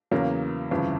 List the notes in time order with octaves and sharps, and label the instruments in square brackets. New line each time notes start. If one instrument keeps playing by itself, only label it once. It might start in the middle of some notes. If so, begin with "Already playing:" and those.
[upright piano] E2 C#3 F#3 A#3 C#4
G1 F2 C#3 E3